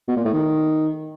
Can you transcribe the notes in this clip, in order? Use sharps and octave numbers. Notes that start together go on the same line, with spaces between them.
B2
A#2
A2
D#3